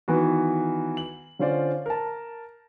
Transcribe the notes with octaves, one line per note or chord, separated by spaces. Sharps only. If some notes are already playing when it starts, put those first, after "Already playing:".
D#3 E3 B3 F#4
F#7
D3 C#4 F4 C5 D5
A#4 A5